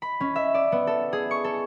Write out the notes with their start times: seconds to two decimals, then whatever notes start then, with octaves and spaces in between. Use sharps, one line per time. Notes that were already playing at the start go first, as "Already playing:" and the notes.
0.02 B5
0.20 C#4
0.36 E5
0.54 D5
0.72 B3
0.87 A4
1.13 G#4
1.31 C#6
1.44 A4